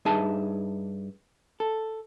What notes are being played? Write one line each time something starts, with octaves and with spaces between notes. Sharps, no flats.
G2 D#4 G#4 E5 G#5 A5
A4